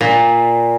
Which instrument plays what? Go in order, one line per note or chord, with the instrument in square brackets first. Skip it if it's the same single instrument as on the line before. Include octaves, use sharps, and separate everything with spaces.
[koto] A#2